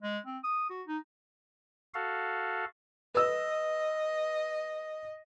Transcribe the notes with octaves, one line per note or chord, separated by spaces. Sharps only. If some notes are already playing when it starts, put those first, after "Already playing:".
G#3
C4
D#6
F#4
D#4
F#4 A4 F5
B4 D#5 E6